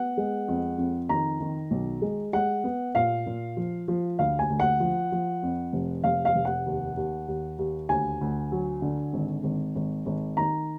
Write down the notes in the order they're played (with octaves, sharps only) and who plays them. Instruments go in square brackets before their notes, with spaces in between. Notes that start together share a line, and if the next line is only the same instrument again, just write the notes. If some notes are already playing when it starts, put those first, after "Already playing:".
Already playing: [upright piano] B3 F#5
G#3
F2
F2
D#3 A#5
D#3
B1
G#3
G#3 F#5
B3
A#2 F5
A#2
F3
F3
D2 F5
G#5
D2
F#5
F3
F3
F2
F1
F1 F5
F5
F1
F#5
D#2
D#2
D#2
D#2
D2 G#5
D2
F#3
D3
G#1
G#1
G#1
G#1
D#3 A#5